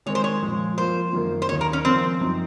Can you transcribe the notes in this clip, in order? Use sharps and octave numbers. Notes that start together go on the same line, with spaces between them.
D#3 G#3 C4 C#5
C5
C#5
A#2 F3 G#3
F3 A#3 F4 C5
F#2 D#3 A#3 F4
C5
D#2 D#3 A#3 D#4 C#5
A#4
C#4
C#3 F3 A#3 C4 F4
F#2 F3 C4 D#4